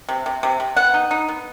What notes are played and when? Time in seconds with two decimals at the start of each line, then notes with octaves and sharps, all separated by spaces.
0.09 C3
0.26 C3
0.43 C3
0.60 C3
0.76 B3 F#5
0.94 D#4
1.11 D#4
1.28 B3